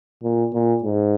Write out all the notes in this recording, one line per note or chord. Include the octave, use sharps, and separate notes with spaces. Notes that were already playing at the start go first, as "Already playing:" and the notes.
A#2
A#2
G#2